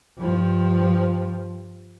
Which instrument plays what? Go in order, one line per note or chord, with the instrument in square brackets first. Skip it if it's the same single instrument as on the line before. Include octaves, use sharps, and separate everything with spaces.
[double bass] G2 F3